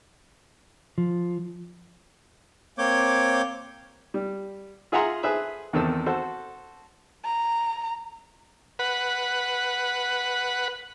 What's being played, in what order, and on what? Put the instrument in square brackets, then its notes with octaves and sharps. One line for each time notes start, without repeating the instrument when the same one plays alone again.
[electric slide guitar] F3
[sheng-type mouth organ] A#3 C4 C#5 D6 G6
[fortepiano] G3
F4 G#4 E5 F#5 A#5 C6
G#4 A4 B4 C5 E5
E2 D#3 C4 A4 E6
F#4 A4 C5
[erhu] A#5
[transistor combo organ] B4 F#5